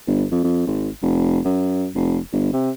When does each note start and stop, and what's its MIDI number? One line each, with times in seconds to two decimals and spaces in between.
0.07 0.25 31
0.32 0.39 41
0.44 0.62 41
0.67 0.89 32
1.02 1.39 29
1.45 1.87 42
1.95 2.18 29
2.33 2.49 31
2.53 2.71 48